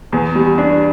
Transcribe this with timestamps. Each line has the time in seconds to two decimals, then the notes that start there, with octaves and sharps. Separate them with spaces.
0.12 E2
0.35 G3
0.58 D4